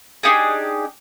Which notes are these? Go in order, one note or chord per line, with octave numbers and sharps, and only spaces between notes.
D4 D#4 G4 G#4